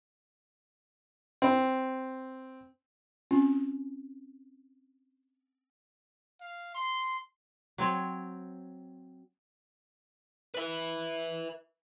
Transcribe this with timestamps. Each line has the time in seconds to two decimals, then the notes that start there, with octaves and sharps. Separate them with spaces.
1.42 C4
3.31 C4 C#4 F4
6.41 F5
6.75 C6
7.78 F#3 C4 C#5
10.54 B4 E5